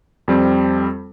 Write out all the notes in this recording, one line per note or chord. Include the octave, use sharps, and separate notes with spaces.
F2 G3 C4